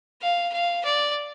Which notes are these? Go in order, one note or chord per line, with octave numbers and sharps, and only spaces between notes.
F5
F5
D5